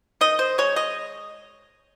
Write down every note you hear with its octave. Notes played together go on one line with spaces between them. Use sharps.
D#3 D#5
C5
G#3 C#5
D#5